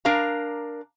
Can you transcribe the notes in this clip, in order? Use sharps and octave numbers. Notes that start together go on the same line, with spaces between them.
D4 A#4 F5 A#5